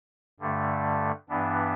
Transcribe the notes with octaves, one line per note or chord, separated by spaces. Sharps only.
G2 D3 A3
G2 E3 B3 D4